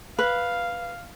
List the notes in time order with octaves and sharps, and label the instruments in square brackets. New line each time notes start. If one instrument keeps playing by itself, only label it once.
[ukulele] B4 [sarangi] F5